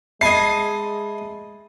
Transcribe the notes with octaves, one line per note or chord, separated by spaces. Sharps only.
G#3 D#5 E5 G#5 A5 B5 C7